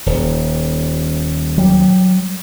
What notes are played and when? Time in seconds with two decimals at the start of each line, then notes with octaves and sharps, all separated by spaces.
0.06 D#1
1.58 F#3 G3